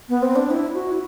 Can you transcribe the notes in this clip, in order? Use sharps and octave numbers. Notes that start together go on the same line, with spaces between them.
B3
C4
D4
E4
F#4
E4